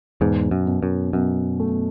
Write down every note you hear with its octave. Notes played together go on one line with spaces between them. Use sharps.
E2 G#2 B2
F#2
B2
F#2
F#2 B2
A3